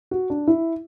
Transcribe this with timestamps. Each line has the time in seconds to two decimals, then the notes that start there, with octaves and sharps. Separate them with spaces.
0.11 F#4
0.30 D4
0.47 E4